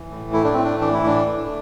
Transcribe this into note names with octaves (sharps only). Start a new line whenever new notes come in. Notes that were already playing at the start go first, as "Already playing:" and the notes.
Already playing: E3
A2
A3 E4
D4
A2 C4
D4
E3 D4
E4
A2 D4
A3